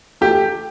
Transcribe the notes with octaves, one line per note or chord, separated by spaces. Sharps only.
A3 G4